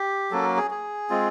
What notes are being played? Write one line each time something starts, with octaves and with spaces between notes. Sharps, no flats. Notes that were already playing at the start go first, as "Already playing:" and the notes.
Already playing: G4
F#3 A#3 C#4 A4
G#4
G#4
G#3 C4 F4